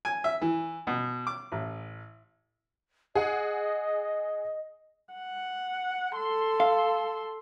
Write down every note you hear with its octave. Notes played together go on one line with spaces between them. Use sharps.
G#5
E5
E3
B2
D6
A1
G#4 D#5 F#5
F#5
A4 C6
F5